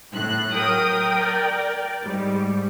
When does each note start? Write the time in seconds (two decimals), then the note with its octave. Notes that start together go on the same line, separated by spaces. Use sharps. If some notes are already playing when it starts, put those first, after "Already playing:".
0.13 A2 F#6
0.51 F#3 A#4 G5 D#6
1.21 D5
2.05 G#2 G3